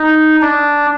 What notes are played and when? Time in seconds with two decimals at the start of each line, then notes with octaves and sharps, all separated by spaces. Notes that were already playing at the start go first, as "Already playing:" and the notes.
Already playing: D#4
0.42 D4